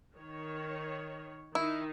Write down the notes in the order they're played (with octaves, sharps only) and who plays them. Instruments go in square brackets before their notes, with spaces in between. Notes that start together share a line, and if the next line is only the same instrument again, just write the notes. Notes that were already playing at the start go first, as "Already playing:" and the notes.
[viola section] D#3 C#5
[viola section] D#3 D#4 [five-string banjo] E4